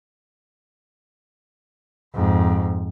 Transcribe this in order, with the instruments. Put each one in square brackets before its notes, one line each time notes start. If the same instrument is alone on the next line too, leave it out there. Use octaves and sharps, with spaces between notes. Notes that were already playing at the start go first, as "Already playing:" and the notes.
[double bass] F2 G#2